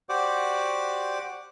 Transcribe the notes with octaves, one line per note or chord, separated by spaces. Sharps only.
F#4 G4 C5 D5 F#5 D6